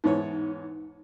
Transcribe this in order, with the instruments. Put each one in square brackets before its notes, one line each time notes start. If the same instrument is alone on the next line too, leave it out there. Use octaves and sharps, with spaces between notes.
[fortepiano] E2 G#2 C#5 [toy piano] D#4